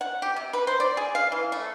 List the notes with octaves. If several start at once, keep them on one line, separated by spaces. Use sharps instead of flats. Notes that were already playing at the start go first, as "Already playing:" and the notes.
F#5
G4
C3
B4
C5
D5
G#4
F5
E3
A3